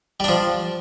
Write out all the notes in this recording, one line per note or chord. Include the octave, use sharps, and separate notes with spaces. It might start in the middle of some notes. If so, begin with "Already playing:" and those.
F3 G3 D4